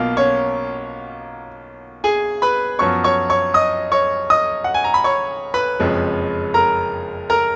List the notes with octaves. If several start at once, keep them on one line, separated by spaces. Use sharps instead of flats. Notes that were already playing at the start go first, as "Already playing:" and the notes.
Already playing: B1 B2 A#3 F4 F5
C#4 C#5
G#4 G#5
B4 B5
F#2 F3 B3 C#5 C#6
C#5 C#6
C#5 C#6
D#5 D#6
C#5 C#6
D#5 D#6
F#5
G#5
A#5
B5
C#5 C#6
B4 B5
F#1 F2 F3 G#3 C#4
A#4 A#5
A#4 A#5